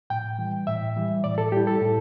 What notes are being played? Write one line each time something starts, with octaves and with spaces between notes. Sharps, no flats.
A2 G5
E3 G3
A2 E5
E3 G3
A2 D5
A4
G3 E4 G4
A4
A2